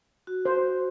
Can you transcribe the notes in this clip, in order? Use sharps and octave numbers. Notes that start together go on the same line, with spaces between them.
F#4
C5